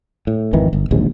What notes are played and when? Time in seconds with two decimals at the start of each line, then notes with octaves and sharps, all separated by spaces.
0.27 A2
0.53 G#1 F2 D#3 E3
0.73 G1
0.91 D1 A#1 D#2 G#2